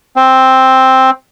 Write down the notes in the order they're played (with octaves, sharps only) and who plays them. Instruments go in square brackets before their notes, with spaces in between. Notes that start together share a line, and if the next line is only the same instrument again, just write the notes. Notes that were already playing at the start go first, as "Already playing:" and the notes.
[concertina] C4